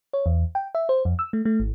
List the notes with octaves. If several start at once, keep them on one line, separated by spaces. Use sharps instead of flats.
C#5
E2
G5
E5
C5
F2
E6
A3
A3
G#1